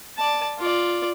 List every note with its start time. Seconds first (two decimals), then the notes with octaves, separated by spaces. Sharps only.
0.17 D5 A5
0.59 F4 D5